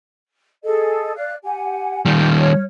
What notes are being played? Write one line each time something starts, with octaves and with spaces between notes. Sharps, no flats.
G#4 A4 D#5
D5 F5 F#6
G4 F#5 G#5
D#3 G3 D5 G6
C#5 F6